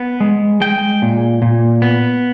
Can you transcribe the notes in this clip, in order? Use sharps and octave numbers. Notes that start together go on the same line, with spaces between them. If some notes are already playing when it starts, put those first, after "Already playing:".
Already playing: B3
G#3
G#3 G5
A#2
A#2
B3